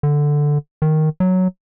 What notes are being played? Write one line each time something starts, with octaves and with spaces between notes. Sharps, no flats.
D3
D#3
F#3